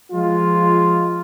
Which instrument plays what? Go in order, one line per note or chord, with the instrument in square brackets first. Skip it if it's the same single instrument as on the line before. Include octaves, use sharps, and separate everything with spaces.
[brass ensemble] F3 G#3 F4